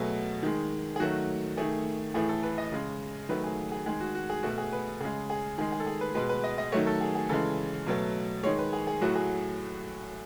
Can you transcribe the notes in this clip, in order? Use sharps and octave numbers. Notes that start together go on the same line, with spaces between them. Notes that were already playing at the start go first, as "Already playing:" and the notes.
Already playing: B2 F#3 A3 G#4
D#3 G#3
G#4
D#3 F#3 A3 F#4
D#3 A3 G#4
A2 E3 A3 G#4
A4
B4
D#5
C#3 G#3
D#3 F#3 A3 B4
G#4
G#4
D#3 G#3 G#4
F#4
F#4
G#4
B2 A3 F#4
G#4
B4
C#3 G#3 G#4
G#4
D#3 G#3 G#4
G#4
A4
G#4
B4
B2 G#3 B4
B4
D#5
D#5
D#3 F#3 A3 C#5
A4
G#4
G#4
C#3 E3 G#3 A4
B2 F#3 A3
D#3 G#3 C#5
B4
G#4
G#4
A2 F#3 A3 F#4
G#4